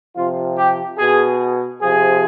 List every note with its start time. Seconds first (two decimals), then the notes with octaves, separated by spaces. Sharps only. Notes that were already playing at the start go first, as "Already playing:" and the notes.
0.14 C3 F3 F4
0.57 G4
0.97 B2 G#4
1.81 C3 F3 G#4